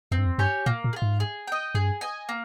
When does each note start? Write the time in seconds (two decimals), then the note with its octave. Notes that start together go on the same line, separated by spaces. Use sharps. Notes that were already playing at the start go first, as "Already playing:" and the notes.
0.11 F2 C4
0.18 G2
0.26 F2
0.38 G2 G4 C#5 G#5
0.66 A#2 A#3
0.84 A#2
0.93 G#4
0.96 F4
1.02 G#2
1.20 G#4
1.47 D#5 G5
1.75 G2 G#4
2.01 D#5 G#5
2.29 A#3